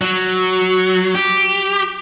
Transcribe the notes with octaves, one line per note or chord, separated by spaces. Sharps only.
F#3
G4